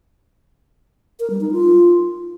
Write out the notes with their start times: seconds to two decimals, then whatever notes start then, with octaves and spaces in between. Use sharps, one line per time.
1.19 A#4
1.30 G3
1.41 D#4
1.51 F4